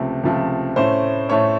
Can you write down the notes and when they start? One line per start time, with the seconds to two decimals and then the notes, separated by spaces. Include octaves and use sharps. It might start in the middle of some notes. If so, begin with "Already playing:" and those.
Already playing: C#2 C3 F3 A3
0.23 C#2 C3 F3 A3
0.76 A2 A3 C#4 C5
1.29 A2 A3 C#4 C#5